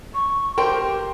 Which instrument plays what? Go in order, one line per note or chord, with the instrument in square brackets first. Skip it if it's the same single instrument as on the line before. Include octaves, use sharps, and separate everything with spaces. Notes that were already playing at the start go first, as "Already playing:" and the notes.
[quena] C#6
[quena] G4 [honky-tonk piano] A#4 C5 C6 [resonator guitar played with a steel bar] G5